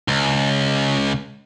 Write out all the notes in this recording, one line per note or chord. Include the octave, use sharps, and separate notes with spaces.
C#2